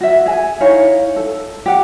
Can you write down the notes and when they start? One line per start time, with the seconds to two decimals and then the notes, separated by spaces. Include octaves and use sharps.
0.01 F#4 E5
0.26 G#4 G#5
0.60 D#4 E4 C#5 F5
1.16 A4
1.66 G4 F#5